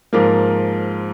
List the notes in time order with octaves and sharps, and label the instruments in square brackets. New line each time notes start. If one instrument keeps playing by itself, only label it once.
[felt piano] G#2 F3 A#3 A#4